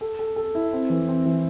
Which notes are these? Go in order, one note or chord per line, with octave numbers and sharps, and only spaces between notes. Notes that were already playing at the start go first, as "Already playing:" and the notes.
A4
A4
A4
E4
C4
E3
C4
E3